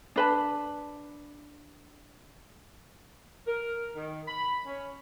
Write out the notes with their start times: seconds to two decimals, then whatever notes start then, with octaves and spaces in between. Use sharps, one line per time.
0.16 D4 B4 A5
3.47 A#4
3.95 D#3
4.28 B5
4.66 C#4